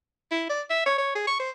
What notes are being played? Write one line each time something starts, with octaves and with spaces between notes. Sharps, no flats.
E4
D5
E5
C#5
C#5
G#4
C#6
C5